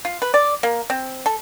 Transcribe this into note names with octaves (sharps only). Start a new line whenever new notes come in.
F4
B4
D5
A#3
C4
A4